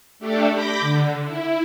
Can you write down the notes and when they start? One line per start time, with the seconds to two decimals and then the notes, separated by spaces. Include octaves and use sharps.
0.19 A3 D4 G4 A4
0.51 B5 D6 G6 A#6
0.80 D3
1.22 E4